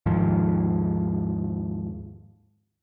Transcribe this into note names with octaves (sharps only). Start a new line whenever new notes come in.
D#2 G#2 D#3 F3